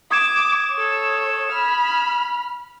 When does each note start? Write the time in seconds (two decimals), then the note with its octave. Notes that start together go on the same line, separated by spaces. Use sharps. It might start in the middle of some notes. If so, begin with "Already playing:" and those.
0.11 D6 D#6 G#6 E7
0.72 A4 C#5
1.52 B5 F6